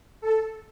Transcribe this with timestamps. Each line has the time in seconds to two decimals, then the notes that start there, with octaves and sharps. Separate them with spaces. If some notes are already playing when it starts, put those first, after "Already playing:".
0.21 A4